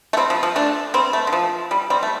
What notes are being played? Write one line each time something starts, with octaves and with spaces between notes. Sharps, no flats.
A3
G3 C4
F3
F3
A3 D4
G3 C4
A3
D3
F3
G3
G3 C4
A3